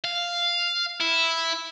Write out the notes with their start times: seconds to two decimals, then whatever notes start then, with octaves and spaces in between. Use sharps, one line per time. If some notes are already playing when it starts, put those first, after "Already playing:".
0.04 F5
1.01 E4